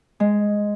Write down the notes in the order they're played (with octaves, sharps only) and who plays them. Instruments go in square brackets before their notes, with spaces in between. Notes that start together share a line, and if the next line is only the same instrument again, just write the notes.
[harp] G#3